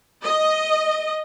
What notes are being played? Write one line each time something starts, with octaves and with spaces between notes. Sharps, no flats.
D#5